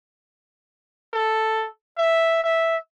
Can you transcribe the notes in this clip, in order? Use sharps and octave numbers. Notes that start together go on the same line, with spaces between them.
A4
E5
E5